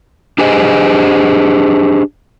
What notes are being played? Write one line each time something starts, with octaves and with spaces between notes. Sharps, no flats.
D4 G4 G#4 C5 D#5